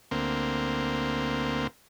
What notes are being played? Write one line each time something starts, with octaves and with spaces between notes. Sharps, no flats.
D2 A#3 C4